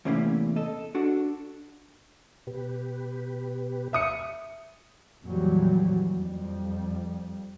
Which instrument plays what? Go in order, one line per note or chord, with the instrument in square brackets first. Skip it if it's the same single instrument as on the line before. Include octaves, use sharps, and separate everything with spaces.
[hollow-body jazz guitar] E2 A2 C3 A#3 C#4 E4
A4 D#5
D4 F#4 A4
[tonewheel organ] B2 G4 B4
[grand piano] E5 D#6 C#7
[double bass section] F2 A#2 E3 F#3 G3
F2 G3